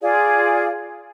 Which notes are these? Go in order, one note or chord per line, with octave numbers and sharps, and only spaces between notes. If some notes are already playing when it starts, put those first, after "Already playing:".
F4 G#4 D5 F5